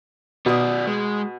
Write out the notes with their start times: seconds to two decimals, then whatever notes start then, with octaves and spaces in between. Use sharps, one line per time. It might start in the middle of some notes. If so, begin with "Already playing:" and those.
0.46 B2 B3 D5 D#6
0.87 G#3